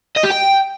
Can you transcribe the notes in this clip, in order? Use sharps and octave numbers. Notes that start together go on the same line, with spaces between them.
D#5
G4
G5